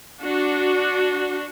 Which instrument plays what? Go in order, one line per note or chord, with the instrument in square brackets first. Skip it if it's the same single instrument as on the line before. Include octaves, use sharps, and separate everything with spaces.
[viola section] D4 F#4